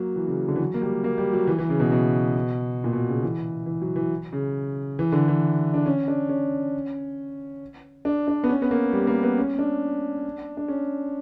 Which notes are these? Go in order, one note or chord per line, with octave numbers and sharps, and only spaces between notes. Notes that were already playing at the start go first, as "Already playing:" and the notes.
Already playing: F#3 A#3
E3
C#3
D3
E3
F#3
A#3
G3
A#3
G3
F#3
E3
E3
C#3
B2
B2
A#2
B2
C#3
E3
E3
F#3
E3
C#3
E3
D3
E3
D4
C#4
D4
C#4
D4
D4
B3
C#4
B3
A#3
G3
A#3
B3
C#4
D4
D4
C#4